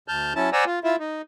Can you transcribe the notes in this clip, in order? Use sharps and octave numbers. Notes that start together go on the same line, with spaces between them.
D2 A5 F6 G6
F#3 C#4 E4 A5
C5 D5 F#5 G#5 A#5 E6
F4
E4 F4 E5
D#4